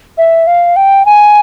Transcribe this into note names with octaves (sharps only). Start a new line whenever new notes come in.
E5
F5
G5
G#5